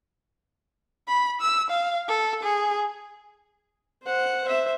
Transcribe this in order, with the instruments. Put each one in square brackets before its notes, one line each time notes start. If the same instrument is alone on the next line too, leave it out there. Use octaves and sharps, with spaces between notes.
[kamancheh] B5
E6
F5
A4
G#4
[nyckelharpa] C5 F#5
C5 E5